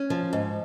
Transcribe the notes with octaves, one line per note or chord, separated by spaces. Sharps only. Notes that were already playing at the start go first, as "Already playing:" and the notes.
Already playing: C#4
F3
G#2